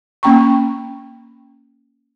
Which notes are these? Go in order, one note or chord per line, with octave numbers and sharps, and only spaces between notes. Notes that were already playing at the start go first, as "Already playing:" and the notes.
A#3 C#4 G5 A#5 C#6